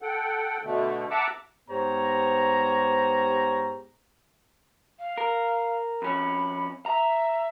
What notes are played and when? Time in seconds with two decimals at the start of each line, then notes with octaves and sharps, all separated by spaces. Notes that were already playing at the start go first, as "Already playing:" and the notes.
0.02 A4 F#5 G5
0.63 B2 D3 A3
1.10 E5 F#5 A5 A#5 D6 E6
1.68 G#2 B3 G4 C5 C#5 A#5
4.99 F5
5.18 A#4
6.02 F2 C#4 B5
6.86 E5 A#5